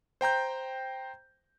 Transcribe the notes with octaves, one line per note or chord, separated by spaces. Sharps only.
C5 G5 A#5 G6